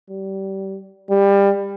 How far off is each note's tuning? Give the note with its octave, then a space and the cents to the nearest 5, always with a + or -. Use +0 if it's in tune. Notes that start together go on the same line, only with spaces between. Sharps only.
G3 -25
G3 +20